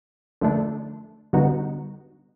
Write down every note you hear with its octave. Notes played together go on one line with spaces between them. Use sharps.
D3 F3 A3 D4
D3 G3 B3 D#4 F#4